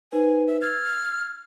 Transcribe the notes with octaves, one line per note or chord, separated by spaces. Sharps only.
D#4 B4 C5 G#5
E5
E6 F6 G#6 A6